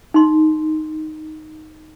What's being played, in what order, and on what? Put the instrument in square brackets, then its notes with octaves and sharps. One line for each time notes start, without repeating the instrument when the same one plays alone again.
[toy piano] D#4 C6